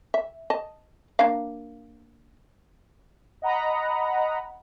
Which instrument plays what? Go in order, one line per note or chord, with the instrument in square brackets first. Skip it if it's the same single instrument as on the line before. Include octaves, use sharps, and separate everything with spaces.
[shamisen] E5
D#5 A5
A#3 D4 F5
[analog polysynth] D#5 F#5 A#5 B5